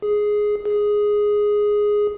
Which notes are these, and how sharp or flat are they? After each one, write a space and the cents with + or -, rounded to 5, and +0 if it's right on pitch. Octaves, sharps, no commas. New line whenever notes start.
G#4 +5
G#4 +0